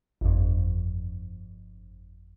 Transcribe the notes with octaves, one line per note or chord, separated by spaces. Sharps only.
G1 F2